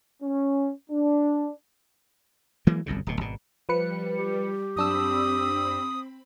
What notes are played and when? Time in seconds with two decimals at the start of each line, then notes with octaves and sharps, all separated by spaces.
0.22 C#4
0.91 D4
2.67 E3 F#3 G#3 A#3
2.86 G1 C2 F#2 C#3
3.07 D1 B2
3.21 G#1 B2
3.69 F3 G3 B4 C#7
4.18 G4
4.76 F#2 C4 D4 B5 D#6 E6